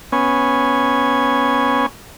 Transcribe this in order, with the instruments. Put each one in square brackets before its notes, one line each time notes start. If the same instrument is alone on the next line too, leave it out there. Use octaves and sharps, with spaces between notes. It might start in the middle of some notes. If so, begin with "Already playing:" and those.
[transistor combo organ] B3 C#4 G#5